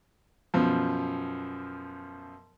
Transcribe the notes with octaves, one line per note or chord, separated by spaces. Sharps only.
F#2 B2 F3